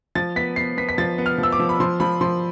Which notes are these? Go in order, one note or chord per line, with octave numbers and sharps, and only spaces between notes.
F3 A6
B3 B6
B3 C7
B3 B6
B6
F3 A6
B3
F6
F3 E6
D6
F3
B5
F3 C6
F3 B5
F3 C6